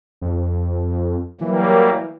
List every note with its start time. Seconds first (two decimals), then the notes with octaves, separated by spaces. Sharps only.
0.22 F2
1.41 E3 F#3 G3 A#3